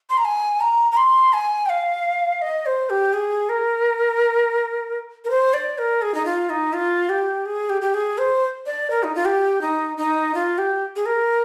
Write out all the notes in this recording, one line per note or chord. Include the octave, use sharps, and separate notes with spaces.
C6
A#5
G#5
A#5
A#5
C6
G#5
G5
F5
D#5
C5
G4
G#4
A#4
A#4
C5
D5
A#4
G#4
D#4
F4
D#4
F4
G4
G#4
G4
G4
G#4
C5
D5
A#4
D#4
F4
G4
D#4
D#4
F4
G4
G#4
A#4